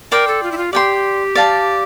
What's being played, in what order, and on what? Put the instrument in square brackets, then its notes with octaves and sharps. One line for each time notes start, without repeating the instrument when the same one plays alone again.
[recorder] A#4 [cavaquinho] D5 G5 C6
[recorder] A4
F4
E4
F4
[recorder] G4 [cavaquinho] D5 G5 C6
[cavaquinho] D5 F5 A5